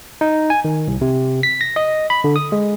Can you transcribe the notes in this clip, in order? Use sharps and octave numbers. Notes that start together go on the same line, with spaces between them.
D#4
G#5
D#3
C2
C3
B6
A#6
D#5
B5
D3
D#6
G#3